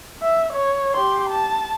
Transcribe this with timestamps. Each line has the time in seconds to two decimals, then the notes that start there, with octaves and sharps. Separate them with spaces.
0.22 E5
0.53 C#5
0.94 G4 C6
1.31 A5